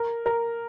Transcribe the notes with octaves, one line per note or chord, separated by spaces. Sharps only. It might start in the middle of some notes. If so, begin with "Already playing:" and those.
Already playing: A#4
A#4